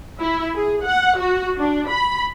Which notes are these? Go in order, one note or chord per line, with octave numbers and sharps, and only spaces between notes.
E4
G#4
F#5
F#4
D4
B5